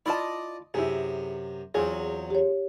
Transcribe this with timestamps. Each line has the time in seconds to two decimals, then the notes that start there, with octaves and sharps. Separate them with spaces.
0.06 E4 F4 D5 D#5 A5
0.74 F#2 C3 E4 G#4
1.74 E2 F#3 C4 F4 G#4
2.30 G4 C#5